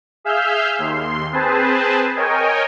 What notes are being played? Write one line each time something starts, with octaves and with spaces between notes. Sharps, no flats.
G#4 E5 F5 E6 F6 G6
D#2 C6
C4 G#4 B4 C5 A5
A#4 C#5 D#5 G5 G#5